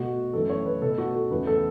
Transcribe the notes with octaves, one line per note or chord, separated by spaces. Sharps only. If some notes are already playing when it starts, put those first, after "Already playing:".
Already playing: B2 A3 F#4
F#2 E3 A3 A4
C#5
B4
B2 A3 A4
F#4
A4
E2 C#3 E3 A3 B4
A4